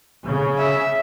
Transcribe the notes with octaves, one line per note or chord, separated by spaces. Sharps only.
C#3
E5